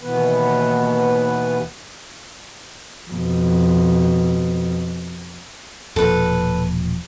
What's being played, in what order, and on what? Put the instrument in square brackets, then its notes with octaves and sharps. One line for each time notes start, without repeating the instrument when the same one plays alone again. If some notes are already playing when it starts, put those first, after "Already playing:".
[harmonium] D#2 B2 E3 B3 B4
[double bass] F2 B2
[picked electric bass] E1 A#2 F3 [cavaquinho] A4 B4